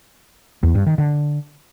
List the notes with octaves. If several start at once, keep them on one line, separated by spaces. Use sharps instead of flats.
E2
G2
D#3
D3